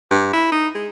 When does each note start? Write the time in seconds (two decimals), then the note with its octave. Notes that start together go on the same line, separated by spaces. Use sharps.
0.11 G2
0.33 E4
0.52 D#4
0.75 G#3